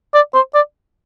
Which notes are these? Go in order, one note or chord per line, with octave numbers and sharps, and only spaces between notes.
D5
C5
D5